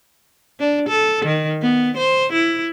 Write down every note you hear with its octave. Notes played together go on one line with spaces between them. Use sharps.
D4
A4
D#3
B3
C5
E4